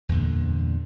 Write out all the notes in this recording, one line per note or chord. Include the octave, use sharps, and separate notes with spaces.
E2 G2 A#2 D3